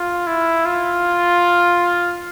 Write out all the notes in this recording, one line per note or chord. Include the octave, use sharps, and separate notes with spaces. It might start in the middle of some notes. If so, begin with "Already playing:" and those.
Already playing: F4
E4
F4